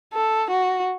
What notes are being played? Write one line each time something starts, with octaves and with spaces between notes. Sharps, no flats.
A4
F#4